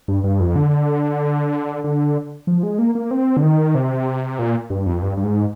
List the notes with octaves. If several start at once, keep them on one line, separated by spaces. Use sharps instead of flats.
G2
G2
F2
D3
D3
F3
G#3
A#3
A#3
C4
D3
D#3
C3
A#2
G2
F2
G2
G2
G#2